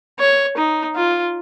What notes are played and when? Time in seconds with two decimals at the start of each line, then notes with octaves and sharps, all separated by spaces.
0.19 C#5
0.57 D#4
0.96 F4